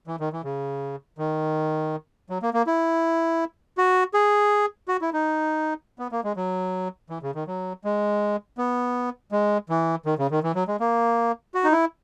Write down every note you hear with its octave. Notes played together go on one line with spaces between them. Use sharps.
E3
D#3
E3
C#3
D#3
F#3
A#3
A#3
E4
F#4
G#4
F#4
E4
D#4
B3
A#3
G#3
F#3
E3
C#3
D#3
F#3
G#3
B3
G#3
E3
D#3
C#3
D#3
E3
F#3
G#3
A#3
F#4
D#4
E4